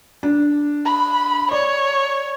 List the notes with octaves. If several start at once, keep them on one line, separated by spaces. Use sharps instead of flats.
D4
B5
C#5 D5